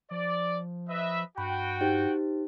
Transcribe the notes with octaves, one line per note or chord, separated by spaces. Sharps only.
F3 D5
B4 D#5 E5
G2 F#4 G5 B5
D#4 G4 C5